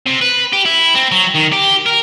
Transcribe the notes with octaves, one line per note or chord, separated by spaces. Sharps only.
C3
B4
G4
E4
C4
F#3
D#3
G4
A#4